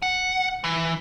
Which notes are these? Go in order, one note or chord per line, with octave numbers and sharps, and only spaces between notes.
F#5
E3